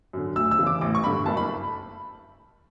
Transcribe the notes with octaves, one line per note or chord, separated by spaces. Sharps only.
F#2 D3
D2 E6
E6
C#3 E3
D6
A1 D6
C#6
G2 D3 B5
F#1 A5
B5